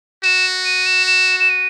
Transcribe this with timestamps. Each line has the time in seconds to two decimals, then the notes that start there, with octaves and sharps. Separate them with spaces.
0.24 F#4 E7
0.65 D#7
0.86 E7
1.07 E7
1.40 E7
1.50 D#7